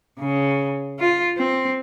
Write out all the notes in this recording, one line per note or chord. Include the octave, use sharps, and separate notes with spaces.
C#3
F4
C4